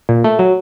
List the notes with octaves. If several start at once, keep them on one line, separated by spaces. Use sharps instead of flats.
A#2
A3
F#3